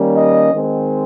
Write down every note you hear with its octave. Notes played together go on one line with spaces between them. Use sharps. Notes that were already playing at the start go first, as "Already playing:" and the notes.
Already playing: D#3 G3 A#3 C#4
D#5
D#3 G#3 C4